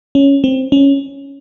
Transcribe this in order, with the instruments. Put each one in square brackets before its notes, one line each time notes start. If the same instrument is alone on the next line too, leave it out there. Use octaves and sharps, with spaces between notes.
[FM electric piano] C#4
C4
C#4